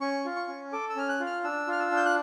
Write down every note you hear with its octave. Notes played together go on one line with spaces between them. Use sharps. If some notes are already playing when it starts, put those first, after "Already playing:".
C#4 C#6
F4
C#6
C#4
A4 D6
E6
C#4 F6
F#6
F4
F6
D4 E6
F4 F6
E6
D4
G6
F#6